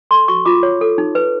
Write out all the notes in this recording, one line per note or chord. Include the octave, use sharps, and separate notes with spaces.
A4 C6
F#4 C#6
F4 D6
C#5
A4
D#4
B4